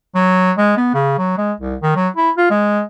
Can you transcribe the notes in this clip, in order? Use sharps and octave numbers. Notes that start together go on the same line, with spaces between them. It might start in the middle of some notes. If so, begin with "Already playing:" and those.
F#3
G#3
B3
C#3
F#3
G#3
C2
D#3
F#3
E4
F4
G#3